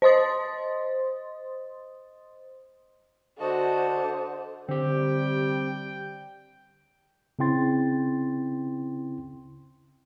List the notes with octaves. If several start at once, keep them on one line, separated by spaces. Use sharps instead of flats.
C5 D#5 C6 D#6 A6
D3 F#4 C5 D#5 A5
D3 G3 C4 G4 G5
C#3 C4 E4 G5 C6 A6